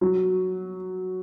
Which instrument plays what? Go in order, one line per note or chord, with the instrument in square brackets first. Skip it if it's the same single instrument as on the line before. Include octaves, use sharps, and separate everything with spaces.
[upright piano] F#3